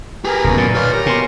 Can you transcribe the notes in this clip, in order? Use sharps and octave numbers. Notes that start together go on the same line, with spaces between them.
G4 G#4 A#4 B4
D1 F#2 B2 G#5
A#2 A#3 A6
B4 C#5 F5 F6
G4 A#4 C#5 E5
B2 G#5 C6